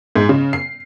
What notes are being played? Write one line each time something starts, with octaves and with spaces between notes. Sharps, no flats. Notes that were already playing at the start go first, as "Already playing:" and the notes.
G#2
C#3
C7